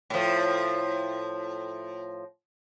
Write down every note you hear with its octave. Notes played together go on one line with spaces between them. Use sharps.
A2 F3